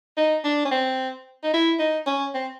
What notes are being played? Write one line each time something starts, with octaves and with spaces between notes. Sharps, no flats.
D#4
D4
C#4
C4
D#4
E4
D#4
C#4
C4